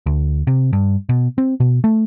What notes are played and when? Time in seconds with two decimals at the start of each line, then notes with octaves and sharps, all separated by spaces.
0.06 D2
0.47 C3
0.73 G2
1.09 B2
1.38 C4
1.60 B2
1.84 A3